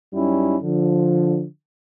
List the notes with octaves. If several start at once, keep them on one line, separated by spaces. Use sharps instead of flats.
F#2 G3 C#4 D#4 E4
D3 F3